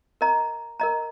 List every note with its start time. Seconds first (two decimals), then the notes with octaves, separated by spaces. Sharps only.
0.21 A#4 D#5 A#5
0.80 A#4 D#5 A#5